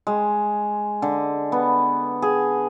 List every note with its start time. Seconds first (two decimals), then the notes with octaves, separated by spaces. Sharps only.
0.07 G#3
1.02 D3
1.52 B3
2.22 G#4